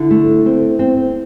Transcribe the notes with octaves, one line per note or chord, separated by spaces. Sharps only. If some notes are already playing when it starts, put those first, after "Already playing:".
Already playing: D3 E4
A3
C4
C4